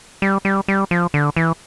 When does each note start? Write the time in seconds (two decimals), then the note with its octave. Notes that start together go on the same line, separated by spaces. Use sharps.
0.22 G3
0.45 G3
0.68 G3
0.91 F3
1.14 D3
1.36 E3